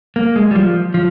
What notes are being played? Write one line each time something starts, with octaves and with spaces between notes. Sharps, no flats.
A#3
G#3
G3
F3
F3